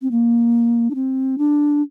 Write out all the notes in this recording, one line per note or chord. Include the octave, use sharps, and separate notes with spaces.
C4
A#3
D4
C4
D4